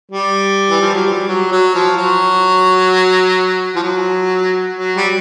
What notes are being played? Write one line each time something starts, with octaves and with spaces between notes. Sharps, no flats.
G3
E3
F3
F#3
G3
F#3
F#3
F3
F#3
F3
F#3
F#3
G3